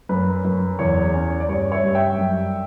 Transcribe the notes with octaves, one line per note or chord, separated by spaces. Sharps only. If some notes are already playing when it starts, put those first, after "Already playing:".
F#2 B4
F#2
E2 C#5
C#4
D5
G2 C#5
C#5 E5
G2
E5 G5
F#2